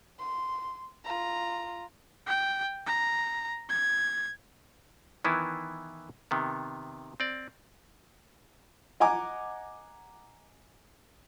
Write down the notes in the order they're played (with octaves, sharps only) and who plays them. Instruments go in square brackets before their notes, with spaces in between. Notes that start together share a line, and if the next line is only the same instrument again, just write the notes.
[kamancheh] C6
F4 A#5
[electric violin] G5
A#5
G#6
[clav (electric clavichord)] D#3 E3 B3 E4
C3 D#3 B3
C4 D5
[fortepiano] D#5 F#5 G#5 A#5 D6